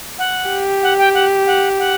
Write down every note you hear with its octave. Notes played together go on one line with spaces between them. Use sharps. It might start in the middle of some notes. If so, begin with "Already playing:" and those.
F#5
G4
F#5
G5
F#5
F#5
F#5